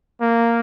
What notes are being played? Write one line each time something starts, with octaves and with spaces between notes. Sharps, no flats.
A#3